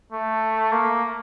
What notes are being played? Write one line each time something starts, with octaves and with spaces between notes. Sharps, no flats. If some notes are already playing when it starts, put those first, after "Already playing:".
A3
A#3